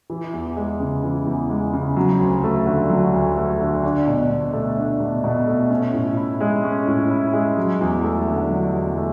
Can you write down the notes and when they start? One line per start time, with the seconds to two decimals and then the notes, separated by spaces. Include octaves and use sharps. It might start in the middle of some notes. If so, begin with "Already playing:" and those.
0.10 E3
0.34 E2
0.56 G#3
0.80 C#3
1.03 E3
1.27 E2
1.50 G#3
1.73 C#3
1.96 F#3
2.20 D2
2.43 A3
2.67 D3
2.90 F#3
3.13 D2
3.36 A3
3.60 D3
3.83 D4
4.07 B2
4.30 B2
4.53 A3
4.77 D4
5.00 B2
5.24 B2
5.47 A3
5.70 C#4
5.94 A2
6.17 E4
6.40 G#3
6.64 C#4
6.88 A2
7.11 E4
7.33 G#3
7.57 F#3
7.80 E2
8.04 A3
8.28 D3
8.51 F#3
8.74 E2
8.97 A3